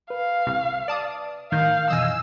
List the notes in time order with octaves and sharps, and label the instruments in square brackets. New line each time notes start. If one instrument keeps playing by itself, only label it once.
[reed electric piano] B4 [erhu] F5
[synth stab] C2
D5 A5 D#6
[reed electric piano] A2 G6 [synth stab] D#3 [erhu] F5
[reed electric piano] F2 B2 E3 [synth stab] D#5 G#5 [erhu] E6